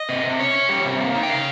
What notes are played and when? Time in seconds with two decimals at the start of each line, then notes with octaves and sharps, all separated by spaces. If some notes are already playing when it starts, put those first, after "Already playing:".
Already playing: D#5
0.09 C3
0.24 C3
0.39 C#4 C#5
0.54 C#4
0.69 G3
0.85 C3
1.00 A#3
1.15 D#4
1.23 G5
1.30 C#3 F5